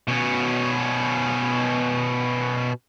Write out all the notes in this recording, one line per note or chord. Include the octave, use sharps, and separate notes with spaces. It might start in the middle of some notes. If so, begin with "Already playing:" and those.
B2 C#4